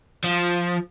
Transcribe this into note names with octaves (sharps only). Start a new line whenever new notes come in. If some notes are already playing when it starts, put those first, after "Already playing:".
F3